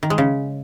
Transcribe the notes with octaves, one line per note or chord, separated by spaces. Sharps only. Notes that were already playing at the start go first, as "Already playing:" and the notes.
D#3
G#3
C#3